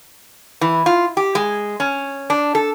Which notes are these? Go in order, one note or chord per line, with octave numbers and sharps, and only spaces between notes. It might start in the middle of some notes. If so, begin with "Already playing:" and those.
E3
F4
G4
G#3
C#4
D4
A4